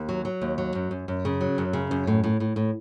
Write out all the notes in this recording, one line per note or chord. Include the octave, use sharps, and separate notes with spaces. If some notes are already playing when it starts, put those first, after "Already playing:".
Already playing: D#2
F#3
F#3
D#2
F#3
F#2
F#2
F#2
C#3
F#3
F#2
C#3
F#2
A2
A2
A2
A2